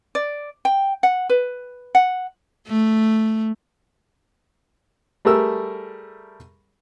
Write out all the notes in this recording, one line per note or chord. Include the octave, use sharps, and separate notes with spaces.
D5
G5
F#5
B4
F#5
A3
G3 A3 G#4 A#4 E6